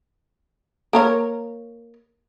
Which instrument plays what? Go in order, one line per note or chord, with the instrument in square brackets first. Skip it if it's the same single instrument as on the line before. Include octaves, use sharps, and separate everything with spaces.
[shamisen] A#3 A#4 C#5